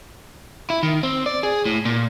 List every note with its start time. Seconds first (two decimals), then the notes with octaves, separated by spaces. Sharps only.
0.70 E4
0.83 D#3
1.03 C4
1.26 D5
1.43 G#4
1.66 A2
1.85 A#2